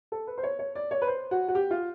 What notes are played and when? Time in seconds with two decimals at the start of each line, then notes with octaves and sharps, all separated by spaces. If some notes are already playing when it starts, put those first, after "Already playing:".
0.12 A4
0.27 B4
0.38 C5
0.43 C#5
0.59 C#5
0.75 D5
0.91 C#5
1.02 B4
1.07 C5
1.31 F#4
1.48 F#4
1.55 G4
1.71 F4